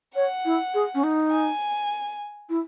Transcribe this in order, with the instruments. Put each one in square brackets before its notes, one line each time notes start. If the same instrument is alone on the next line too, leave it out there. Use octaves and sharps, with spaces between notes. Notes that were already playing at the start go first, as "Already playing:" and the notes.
[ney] C#5 [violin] F#5
[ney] E4
G#4
C#4
D#4
[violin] G#5
[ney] E4